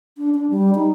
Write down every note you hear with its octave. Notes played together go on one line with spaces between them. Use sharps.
D4
D4
G3
D#4